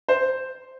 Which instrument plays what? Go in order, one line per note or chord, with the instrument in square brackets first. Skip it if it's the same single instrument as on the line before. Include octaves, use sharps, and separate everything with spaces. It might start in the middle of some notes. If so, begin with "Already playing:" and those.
[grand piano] C5